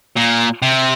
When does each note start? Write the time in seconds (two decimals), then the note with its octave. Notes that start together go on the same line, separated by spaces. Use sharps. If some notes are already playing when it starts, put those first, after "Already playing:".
0.17 A#2
0.62 C3